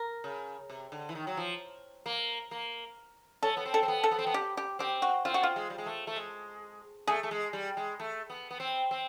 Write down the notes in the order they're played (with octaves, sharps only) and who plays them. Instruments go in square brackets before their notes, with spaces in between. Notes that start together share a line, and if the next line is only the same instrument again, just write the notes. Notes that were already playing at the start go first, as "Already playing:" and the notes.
Already playing: [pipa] A#4
[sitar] C#3
C3
D3
E3
D#3
F#3
F3
A#3
A#3
[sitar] C#4 [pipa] A4
[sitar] B3
C4
[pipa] A4
[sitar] C4
B3
[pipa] A4
[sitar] B3
C4
B3
[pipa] G4
G4
[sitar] C4 [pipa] G4
[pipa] F#4
[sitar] C4 [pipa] F4
[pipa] F#4
F4
[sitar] G#3
G3
G#3
A3
A3
G#3
[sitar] A3 [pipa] G#4
[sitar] A3
G#3
G3
G#3
A3
B3
B3
C4
C4